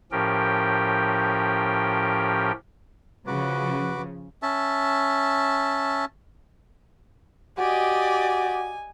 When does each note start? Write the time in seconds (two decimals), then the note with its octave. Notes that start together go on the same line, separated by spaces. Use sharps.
0.12 A2 F3 C#4 G4 A#4 G5
3.27 C#3 F3 F#4 B4 D6
4.43 C#4 E5 A5
7.59 F#4 G4 D5 D#5 G#5